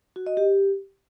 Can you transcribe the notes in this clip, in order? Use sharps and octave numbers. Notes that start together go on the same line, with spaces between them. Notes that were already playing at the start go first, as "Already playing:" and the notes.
F#4
D#5
G4